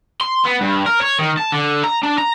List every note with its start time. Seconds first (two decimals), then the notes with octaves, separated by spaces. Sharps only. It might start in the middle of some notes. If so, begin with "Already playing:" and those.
0.21 C6
0.45 B3
0.61 G2
0.86 A#4
1.01 C#5
1.19 D#3
1.37 A5
1.52 D3
1.84 A#5
2.03 D4
2.18 A#5